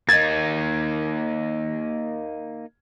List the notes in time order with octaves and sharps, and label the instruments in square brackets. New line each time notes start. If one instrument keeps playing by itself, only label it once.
[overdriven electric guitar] A#3 D#4 [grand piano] G#6 [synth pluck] A6